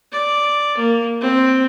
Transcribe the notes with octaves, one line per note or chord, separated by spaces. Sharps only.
D5
A#3
C4